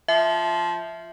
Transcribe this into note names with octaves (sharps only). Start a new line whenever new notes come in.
F3 E5